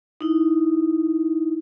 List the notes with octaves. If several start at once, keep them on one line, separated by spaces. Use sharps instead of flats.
D#4 E4